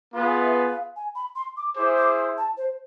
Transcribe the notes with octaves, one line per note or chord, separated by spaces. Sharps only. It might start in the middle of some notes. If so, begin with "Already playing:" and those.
B3 F4 G#4 B4 F5
E5
F5
G#5
B5
C6
D6
E4 G#4 C5 D6
D6
C6
A5
C5